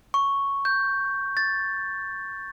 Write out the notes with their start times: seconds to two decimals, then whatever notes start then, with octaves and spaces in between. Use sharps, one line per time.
0.14 C#6
0.65 G6
1.37 A6